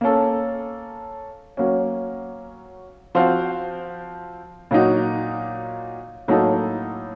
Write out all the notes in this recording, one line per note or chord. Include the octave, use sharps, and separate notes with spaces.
A#3 C#4 A4
F#3 A#3 C#4
F3 C4 F#4 C5 F5
A#2 F#3 A#3 D#4 F#4
A2 F#3 A#3 D#4 A4